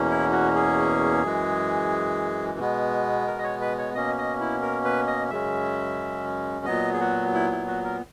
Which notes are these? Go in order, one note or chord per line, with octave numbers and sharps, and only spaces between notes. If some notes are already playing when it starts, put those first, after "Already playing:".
Already playing: E2 B2 A#3 C#4
E4
F#4
G#4
F#2 E3 G#3
B2 G#3 B3
A#4
D#5
C#5
B4
C#5
B2 A#3 C#4 D#5
D#5
E4
A#4
B4
D#5
F#2 C#3 G#3 C#4 E5
A#2 F#3 B3 D#5
G#4
F#4
E4
E4
F#4
A#4